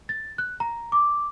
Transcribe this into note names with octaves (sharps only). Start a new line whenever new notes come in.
A6
F#6
A#5
D6